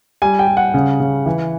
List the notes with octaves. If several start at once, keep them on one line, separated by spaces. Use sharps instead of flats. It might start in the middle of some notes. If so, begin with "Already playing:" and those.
G3 G#5
G5
G3
F#5
C#3
C#3
E3